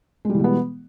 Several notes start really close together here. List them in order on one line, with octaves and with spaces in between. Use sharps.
G#3 G3 E3 B2 B3